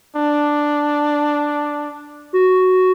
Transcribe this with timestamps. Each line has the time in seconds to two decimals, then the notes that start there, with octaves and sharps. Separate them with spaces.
0.16 D4
2.33 F#4